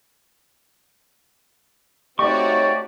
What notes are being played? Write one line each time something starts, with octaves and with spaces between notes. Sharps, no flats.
A3 C4 D#4 F#4 G4 C#5 D5 C#6